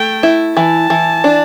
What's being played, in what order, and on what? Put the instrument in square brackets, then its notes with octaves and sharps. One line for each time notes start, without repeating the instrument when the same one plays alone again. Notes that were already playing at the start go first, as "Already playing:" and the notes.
Already playing: [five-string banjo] A3 [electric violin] G5
[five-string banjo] E4
[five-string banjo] E3 [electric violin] A5
[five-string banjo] E3
D4